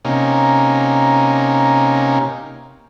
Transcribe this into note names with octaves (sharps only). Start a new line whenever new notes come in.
C3 A#3 C#4 D#4